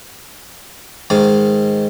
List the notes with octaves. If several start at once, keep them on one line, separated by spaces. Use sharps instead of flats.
G#2 D#3 F5